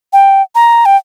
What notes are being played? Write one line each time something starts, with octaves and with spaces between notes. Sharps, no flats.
G5
A#5
G5